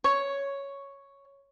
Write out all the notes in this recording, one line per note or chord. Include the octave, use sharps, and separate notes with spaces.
C#5